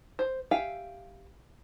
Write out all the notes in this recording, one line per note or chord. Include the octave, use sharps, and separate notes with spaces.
C5
G4 E5 F5 G5 G#5